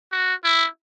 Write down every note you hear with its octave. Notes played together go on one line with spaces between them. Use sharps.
F#4
E4